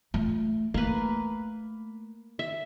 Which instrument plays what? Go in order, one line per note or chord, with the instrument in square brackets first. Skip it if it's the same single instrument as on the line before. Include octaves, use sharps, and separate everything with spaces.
[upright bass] A3 F4
[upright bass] A3 [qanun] A#3 B4
[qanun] E5